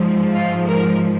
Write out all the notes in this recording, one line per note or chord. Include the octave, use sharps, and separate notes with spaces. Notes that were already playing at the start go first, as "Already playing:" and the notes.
Already playing: G#2 F3
F4
A#4